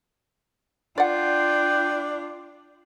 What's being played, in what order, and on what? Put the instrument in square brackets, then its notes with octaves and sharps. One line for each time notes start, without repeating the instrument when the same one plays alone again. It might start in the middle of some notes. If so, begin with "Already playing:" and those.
[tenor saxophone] D4 [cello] F4 [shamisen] D5 F#5 [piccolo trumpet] G5